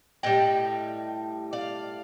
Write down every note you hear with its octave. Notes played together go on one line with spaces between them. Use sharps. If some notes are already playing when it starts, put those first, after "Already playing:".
A2 G3 D#5 G5
D5 F5